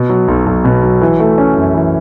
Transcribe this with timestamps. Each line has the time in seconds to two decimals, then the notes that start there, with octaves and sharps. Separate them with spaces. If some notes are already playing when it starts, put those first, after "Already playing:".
Already playing: B2
0.09 F#3
0.28 B1
0.46 B1
0.65 B2
0.83 F#3
1.01 E3
1.20 A3
1.38 C#4
1.56 F#2
1.75 E3